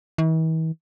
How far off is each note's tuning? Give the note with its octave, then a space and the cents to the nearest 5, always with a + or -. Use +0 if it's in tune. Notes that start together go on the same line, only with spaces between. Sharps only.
E3 -45